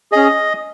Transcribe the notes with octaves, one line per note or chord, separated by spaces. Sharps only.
C#4 G#4 D#5